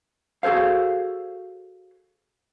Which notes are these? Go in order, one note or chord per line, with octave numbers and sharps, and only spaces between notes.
F#4 G#4 A4 C5 F5